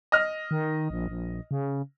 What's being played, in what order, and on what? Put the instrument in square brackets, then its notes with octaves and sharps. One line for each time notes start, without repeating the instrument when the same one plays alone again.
[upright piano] D#5 F6
[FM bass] D#3
A#1
A#1
C#3